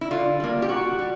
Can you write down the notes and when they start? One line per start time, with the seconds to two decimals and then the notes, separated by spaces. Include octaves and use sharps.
0.01 E4
0.11 D3 F4
0.40 G3 A#3
0.62 G4
0.69 A#2 F#4
0.99 G3